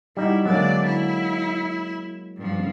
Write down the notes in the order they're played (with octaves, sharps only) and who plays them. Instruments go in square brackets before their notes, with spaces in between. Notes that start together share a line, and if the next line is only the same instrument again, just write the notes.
[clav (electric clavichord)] G3 D#4 F#4 [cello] E4
[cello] D3 D5 [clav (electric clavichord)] F#3 G#3 A#3
[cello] E4
G2 F3